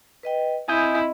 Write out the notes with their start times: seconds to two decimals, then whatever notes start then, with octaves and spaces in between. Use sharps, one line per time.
0.23 B4 D#5 G5
0.68 C4 E4 D#5 G#5 D#6 G6